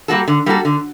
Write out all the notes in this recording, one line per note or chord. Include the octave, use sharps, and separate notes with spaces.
G3 A#3 F#4 A4
D3
G3 A#3 F#4 A4
D3